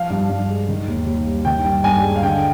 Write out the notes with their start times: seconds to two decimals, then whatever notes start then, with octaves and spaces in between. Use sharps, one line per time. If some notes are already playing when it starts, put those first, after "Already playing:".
Already playing: F3 F5
0.10 G2
0.29 G2
0.49 G#3
0.69 D#3
0.87 D#2
1.06 D#2
1.26 G3
1.45 D#3 G5
1.64 G2
1.83 G2 G#5
2.03 G#3
2.16 F5
2.22 D3 G5